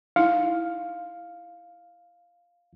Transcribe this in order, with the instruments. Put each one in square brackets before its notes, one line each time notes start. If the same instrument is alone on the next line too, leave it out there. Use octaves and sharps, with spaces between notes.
[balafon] D#4 E4 [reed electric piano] F5